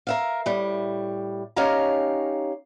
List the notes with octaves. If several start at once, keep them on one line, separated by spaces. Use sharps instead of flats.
A#4 E5 F5
A2 G3
C#4 D#4 G4 C#5 F5 A#5